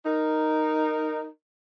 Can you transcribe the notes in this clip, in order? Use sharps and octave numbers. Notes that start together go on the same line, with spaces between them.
D#4 A#4